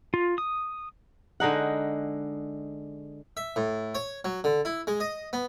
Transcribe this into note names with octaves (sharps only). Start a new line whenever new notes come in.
F4
D#6
D3 G#3 D#4 F#5
E5
A2
C#5
F#3
D3
E4
G#3
D#5
B3